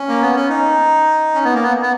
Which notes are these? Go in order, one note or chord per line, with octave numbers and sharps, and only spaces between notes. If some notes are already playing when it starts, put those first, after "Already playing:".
Already playing: C#4
A#3
B3
C#4
D#4
C#4
B3
A#3
B3
B3